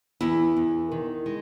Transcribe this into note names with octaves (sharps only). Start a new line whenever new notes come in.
E2 E4
E2
D#3
G#3